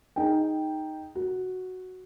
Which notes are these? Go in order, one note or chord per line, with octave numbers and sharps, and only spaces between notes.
D#4 G#4 G5
F#4